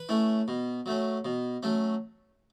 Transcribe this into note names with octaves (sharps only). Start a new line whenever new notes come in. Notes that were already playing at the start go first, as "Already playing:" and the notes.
Already playing: B4
A3 C#4 E4
B2
F#3 A3 C#4
B2
F#3 A3 C#4